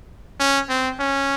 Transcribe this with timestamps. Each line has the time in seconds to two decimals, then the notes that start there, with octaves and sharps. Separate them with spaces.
0.40 C#4
0.69 C4
0.99 C#4